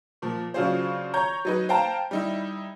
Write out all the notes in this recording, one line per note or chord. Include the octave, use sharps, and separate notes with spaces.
A#2 F3
C#3 F#3 D4 F4 G#4 C5
C#5 A#5 G6 G#6
F#3 D#4 B4
C5 F5 G5 A5 A#5
G3 D#4 E4